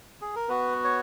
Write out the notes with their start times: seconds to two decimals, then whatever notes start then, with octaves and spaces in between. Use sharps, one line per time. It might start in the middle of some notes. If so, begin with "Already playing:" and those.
0.22 G#4
0.36 A#4
0.49 B3 F#4 B4
0.84 C#5